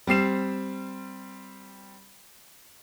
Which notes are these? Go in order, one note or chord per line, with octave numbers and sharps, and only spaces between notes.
G3 C4 C7 E7